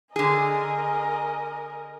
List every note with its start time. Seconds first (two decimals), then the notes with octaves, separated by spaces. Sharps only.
0.16 D3 G#4 A#4 D#5 G#5